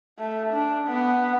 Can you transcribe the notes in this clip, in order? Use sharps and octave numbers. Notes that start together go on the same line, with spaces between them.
A3
D4
B3